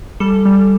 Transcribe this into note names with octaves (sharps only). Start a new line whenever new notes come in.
G3 A4
G3